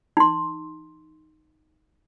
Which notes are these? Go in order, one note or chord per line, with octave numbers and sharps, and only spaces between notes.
D#4 C6